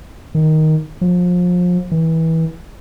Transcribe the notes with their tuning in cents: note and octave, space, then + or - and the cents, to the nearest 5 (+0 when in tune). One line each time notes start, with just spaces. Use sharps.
D#3 +5
F3 +30
E3 -25